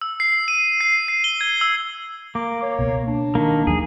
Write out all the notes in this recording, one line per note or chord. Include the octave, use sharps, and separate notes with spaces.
E6
C7
D#7
C7
C7
G7
G#6
E6
A#3 D6
C#5
C#2 B2
D4
D#3 A#3
D#2 E3 F#3 G#4